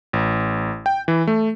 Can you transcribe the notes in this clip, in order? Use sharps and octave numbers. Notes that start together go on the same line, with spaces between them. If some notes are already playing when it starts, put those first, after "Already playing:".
A1
G5
E3
A3